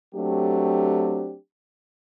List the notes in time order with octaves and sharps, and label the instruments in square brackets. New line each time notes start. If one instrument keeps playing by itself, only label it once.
[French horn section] F#3 A3 C4 D4 G4